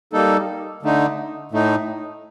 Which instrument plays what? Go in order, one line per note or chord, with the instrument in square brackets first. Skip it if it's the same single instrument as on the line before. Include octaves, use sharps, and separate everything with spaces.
[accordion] G3 A#3 D#4 A4
D3 A3 D#4
A2 A3 D#4